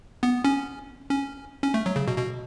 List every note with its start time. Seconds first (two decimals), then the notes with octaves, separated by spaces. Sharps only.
0.23 B3
0.45 C#4
1.09 C#4
1.63 C#4
1.74 A3
1.86 F#3
1.96 C#3
2.08 B2
2.18 B2